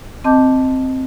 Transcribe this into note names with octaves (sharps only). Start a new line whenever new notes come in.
C4 D#5 A5 D6 G6